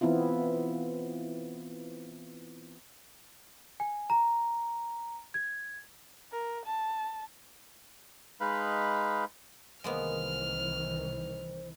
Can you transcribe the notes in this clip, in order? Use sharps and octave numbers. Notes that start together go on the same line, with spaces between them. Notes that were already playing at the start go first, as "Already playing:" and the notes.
E3 B3 C4 E4 F4
G#5
A#5
G#6
A#4
A5
G#3 D#4 B4 F5 B5
C2 D#3 E3 G#3 A#3 B3 C5 F6